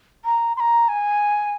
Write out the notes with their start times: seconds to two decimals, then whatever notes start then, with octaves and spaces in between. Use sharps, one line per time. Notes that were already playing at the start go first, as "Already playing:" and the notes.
0.25 A#5
0.57 C6
0.60 A#5
0.88 G#5